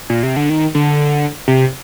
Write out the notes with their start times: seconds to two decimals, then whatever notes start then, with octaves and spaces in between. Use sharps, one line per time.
0.10 A#2
0.23 C3
0.36 D3
0.50 D#3
0.75 D3
1.48 C3